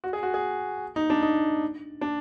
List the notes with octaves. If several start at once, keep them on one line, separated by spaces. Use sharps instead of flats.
F#4
G#4
F#4
G#4
D#4
D4
D#4
D4